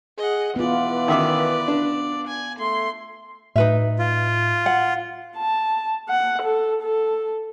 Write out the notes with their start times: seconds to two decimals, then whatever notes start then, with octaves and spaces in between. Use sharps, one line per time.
0.18 G#4 D#5 F#5
0.56 E3 B3 F4 B4 D5
1.08 D#3 E5 D6
1.68 D4
2.27 G#5
2.59 A3 C6
3.56 A2 D#4 B4 E5
3.99 F4
4.66 F#5
5.37 A5
6.09 F#5
6.43 A4
6.82 A4